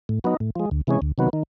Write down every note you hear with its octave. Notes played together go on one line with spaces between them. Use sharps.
A2
F#3 B3 D#4
A2
F3 G#3
D2
C3 E3 G#3 C#4
D2
C3 D#3 F#3 B3
D#3